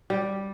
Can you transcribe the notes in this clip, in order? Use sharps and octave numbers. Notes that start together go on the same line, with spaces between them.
G3